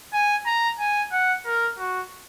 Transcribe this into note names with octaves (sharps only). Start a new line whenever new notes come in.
G#5
A#5
G#5
F#5
A#4
F#4